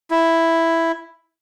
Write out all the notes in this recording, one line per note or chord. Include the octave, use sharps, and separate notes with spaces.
E4